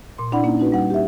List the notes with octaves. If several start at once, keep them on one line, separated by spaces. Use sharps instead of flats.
A#2 C6
C4 D4 E4 D5 F#5 B5
A#3 C#4 D#4
C#4 D#4 F#4 B4
G3 F#5
G4 E5